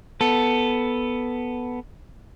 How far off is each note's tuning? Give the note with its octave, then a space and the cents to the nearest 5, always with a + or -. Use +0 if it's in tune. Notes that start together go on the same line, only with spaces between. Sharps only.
B3 +0 A4 +0